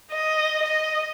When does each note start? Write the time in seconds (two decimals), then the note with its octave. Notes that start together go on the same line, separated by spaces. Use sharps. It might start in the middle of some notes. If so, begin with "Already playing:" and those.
0.12 D#5
0.63 D#5